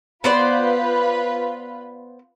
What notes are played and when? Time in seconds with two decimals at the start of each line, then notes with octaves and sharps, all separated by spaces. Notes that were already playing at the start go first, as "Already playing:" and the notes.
0.24 B3 F4 B4 C5 D5